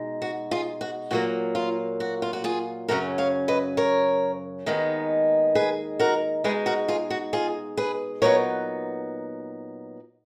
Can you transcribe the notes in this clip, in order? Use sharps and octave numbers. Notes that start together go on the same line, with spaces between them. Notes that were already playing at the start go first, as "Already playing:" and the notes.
Already playing: B2 G#3 D#4
F#4
F4 G#4
F#4
A#2 F#3 A#3 F#4
F4
F#4
F4
F#4
F4 G#4
F#2 C#3 F#3 C#4 F#4 A#4
C#5 F5
B4 D#5
A#4 C#5
D#2 D#3 G#3 B3 D#4
G#4 B4
F#4 A#4
B2 G#3 D#4 G#4 B4
F#4 A#4
F4 G#4
F#4
F4 G#4
G#4 B4
A#2 F#3 B3 D#4 A#4 C#5